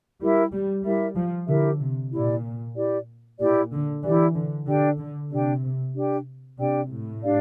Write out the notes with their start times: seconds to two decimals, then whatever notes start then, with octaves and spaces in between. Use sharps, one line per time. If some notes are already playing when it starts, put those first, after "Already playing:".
0.20 G3 E4 G4 A#4 E5
0.52 G3
0.84 G3 E4 G4 A#4 E5
1.16 F3
1.48 D3 E4 G4 A#4 E5
1.80 C3
2.12 A#2 E4 G4 D5
2.75 E4 G4 D5
3.39 A#2 E4 G4 D5
3.72 D3
4.03 E3 E4 G4 D5
4.34 D3
4.66 D3 D4 G4 D5 G5
4.99 D3
5.30 C3 D4 G4 D5 G5
5.94 D4 G4 D5 G5
6.58 C3 D4 G4 D5 G5
6.90 A2
7.23 D4 G4 D5 F5